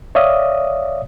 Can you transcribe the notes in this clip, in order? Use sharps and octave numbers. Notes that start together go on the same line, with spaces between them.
C#5 D5 E5 F5 D#6